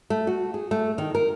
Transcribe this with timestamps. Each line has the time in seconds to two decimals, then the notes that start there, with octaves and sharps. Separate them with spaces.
0.10 A3
0.27 F#4
0.54 G#4
0.71 A3
0.98 D#3
1.15 A#4